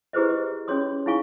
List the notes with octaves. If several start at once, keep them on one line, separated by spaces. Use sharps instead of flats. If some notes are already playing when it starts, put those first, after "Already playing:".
E4 G4 G#4 B4 C5 D#5
D#5
C#4 F#4 G#4 C#5 C6 D#6
D#4 E4 G#4 F5 G#5 C#6